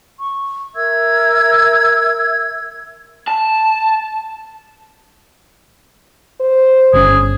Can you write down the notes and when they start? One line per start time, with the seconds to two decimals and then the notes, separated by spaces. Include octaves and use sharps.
0.18 C#6
0.75 A#4 E5 E6 G#6
3.28 A5
6.40 C5
6.93 G1 C#3 C#4 G#4